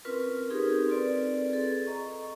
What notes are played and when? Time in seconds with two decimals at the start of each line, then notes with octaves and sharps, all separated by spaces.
0.05 C4 C#4 F4 A#4 B4
0.50 C4 D#4 G4 G#4 A#4
0.88 C4 F4 A4 B4 D5
1.50 G#4 A4
1.87 D#5 A#5 C#6